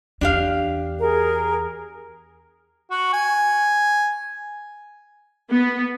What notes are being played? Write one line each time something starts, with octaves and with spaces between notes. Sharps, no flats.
E2 D4 G4 F5
G#4 A#4
F#4
G#5
B3